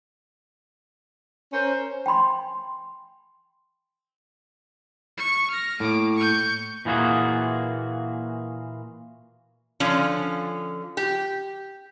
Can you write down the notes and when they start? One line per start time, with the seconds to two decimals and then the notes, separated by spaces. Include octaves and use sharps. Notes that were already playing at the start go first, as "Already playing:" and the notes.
1.52 C#4 A#4 C5
2.06 G5 G#5 B5 C6
5.18 C#6
5.51 F6 A#6
5.80 A2 A#3 D6
6.16 C#6 G6
6.85 A#2 E3 A#3 F4 F#4 G#4
9.80 D3 F3 C#4
10.97 G4